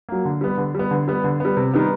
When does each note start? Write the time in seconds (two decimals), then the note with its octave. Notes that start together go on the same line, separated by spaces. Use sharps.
0.09 F#3 A#3
0.25 D3
0.41 G3 B3
0.58 D3
0.75 G3 B3
0.91 D3
1.08 G3 B3
1.24 D3
1.40 G3 B3
1.57 C3
1.73 D#3 G3 B3